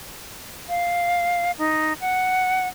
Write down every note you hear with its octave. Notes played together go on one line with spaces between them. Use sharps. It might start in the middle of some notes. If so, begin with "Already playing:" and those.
F5
D#4
F#5